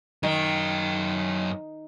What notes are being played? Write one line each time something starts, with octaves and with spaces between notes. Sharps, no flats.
F#2 D#3 G5